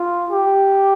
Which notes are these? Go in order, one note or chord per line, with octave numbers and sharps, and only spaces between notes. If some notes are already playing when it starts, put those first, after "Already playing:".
Already playing: F4
G4